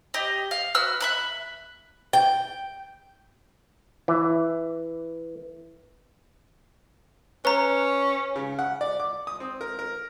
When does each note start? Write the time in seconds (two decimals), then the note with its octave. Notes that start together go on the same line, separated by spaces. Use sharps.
0.14 G4 D#5
0.51 F5
0.74 F#4 B4 E6 F6
1.00 E5 B5 F#6
2.13 G5
4.08 E3
7.45 C#4 B4 A#5
8.36 C#3
8.59 F#5
8.81 D5
9.00 D6
9.27 D#6
9.40 C4
9.61 A#4
9.79 A#4